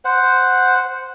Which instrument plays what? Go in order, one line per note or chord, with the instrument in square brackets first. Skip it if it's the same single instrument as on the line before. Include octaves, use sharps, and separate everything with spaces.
[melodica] C5 F#5